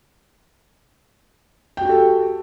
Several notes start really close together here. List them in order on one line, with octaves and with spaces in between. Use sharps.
G5 F#4 G4 A4